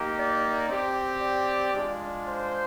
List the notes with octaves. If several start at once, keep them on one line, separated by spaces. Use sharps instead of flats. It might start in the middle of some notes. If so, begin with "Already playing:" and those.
Already playing: A#3 D#4 G4
D5
C4 G4
D5
G#3 D4 F4
C5